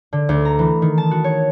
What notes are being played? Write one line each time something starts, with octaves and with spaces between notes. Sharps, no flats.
D3
D2
A#5
E3
D#3
A5
F#4
C#5